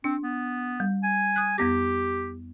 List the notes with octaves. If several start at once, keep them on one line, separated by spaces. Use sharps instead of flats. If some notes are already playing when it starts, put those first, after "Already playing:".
C4 D4
B3
G3
G#5
D#6 F#6
F2 B3 G4 A#6